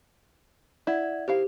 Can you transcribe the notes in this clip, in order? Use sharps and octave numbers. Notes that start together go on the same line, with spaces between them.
E4 D5 F#5 G#6
D#3 E4 G4 C5 F5